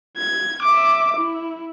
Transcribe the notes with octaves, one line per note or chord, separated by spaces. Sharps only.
G#6
E5 D6
E4